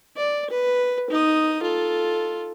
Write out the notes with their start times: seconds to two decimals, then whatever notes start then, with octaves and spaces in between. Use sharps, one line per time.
0.17 D5
0.50 B4
1.10 D#4 D#6
1.62 F4 A4